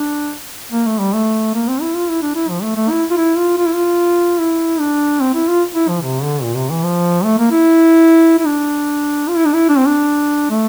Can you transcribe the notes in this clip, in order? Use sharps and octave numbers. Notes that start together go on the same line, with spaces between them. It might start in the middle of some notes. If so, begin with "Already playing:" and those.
Already playing: D4
A#3
A3
G3
A3
A#3
C4
E4
F4
E4
D4
E4
F3
A3
A3
E4
F4
E4
F4
F4
E4
F4
E4
D4
C4
E4
F4
E4
F3
C3
D3
A#2
C3
E3
F3
A3
A#3
E4
E4
D4
F4
E4
D4
E4
D4
C4
D4
A3